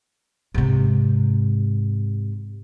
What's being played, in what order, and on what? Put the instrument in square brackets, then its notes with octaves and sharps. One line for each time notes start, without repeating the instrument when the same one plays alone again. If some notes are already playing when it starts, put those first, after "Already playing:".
[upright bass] G#2 C3